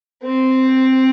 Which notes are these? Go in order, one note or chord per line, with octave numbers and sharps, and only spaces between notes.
C4